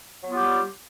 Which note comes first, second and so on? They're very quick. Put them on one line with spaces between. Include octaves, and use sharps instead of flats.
F#3 B3 F4 G4 G3